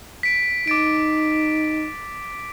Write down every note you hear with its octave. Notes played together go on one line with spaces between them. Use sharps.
B6 D7
D#4 D6 A6 D7